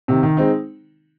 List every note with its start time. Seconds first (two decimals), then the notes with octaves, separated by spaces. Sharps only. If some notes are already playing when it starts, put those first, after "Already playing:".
0.08 C3 D#3
0.23 D#3
0.37 G#3 C4 D#4